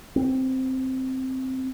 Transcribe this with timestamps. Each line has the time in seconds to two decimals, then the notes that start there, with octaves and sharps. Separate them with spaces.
0.16 B3 C4